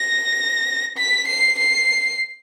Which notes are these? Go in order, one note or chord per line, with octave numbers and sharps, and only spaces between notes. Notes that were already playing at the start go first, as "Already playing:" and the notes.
Already playing: A#6
B6
C7
C7